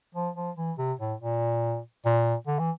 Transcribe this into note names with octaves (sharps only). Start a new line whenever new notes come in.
F3
F3
E3
C3
A2
A#2
A#2
D3
E3